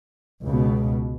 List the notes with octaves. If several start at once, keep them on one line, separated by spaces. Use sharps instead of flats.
C#2 B2